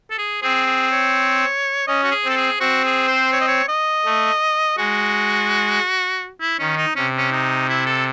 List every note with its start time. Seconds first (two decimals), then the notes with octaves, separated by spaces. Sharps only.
0.11 A4
0.18 G#4
0.42 C4 G#4
0.66 G#4
0.92 C#5
1.87 C#4 D#5
2.04 F#4
2.12 G#4
2.25 C4
2.30 A4
2.37 G#4
2.60 C4 F#4
2.85 G#4
3.08 C5
3.33 C#5
3.41 D#5
3.48 C#5
3.69 D#5
4.05 A3
4.78 G#3 F#4
6.41 E4
6.59 D#3 C#4
6.77 D#4
6.96 C3 C#4
7.18 C#4
7.32 D#4
7.69 E4
7.86 A4